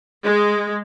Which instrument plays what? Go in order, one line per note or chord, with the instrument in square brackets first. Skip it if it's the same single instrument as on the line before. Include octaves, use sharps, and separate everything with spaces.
[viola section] G#3